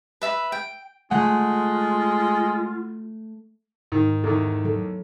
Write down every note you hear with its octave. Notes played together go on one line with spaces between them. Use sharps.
B4 E5 B5
G5
G#3 A3 F4 F#5
G#2 D#3
E2 D#3 A4
F#3 A4